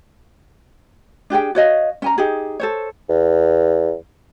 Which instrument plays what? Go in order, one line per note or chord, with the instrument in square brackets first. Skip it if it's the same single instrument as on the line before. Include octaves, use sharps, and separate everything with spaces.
[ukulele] D4 G4 G#4 G5
F#4 C#5 D#5 F5
C#4 G#5 A#5
D#4 G4 G#4
A4 C5 C#5
[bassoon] E2